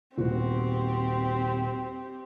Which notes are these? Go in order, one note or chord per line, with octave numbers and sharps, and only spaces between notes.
D#1 B3 C4 F#4 G4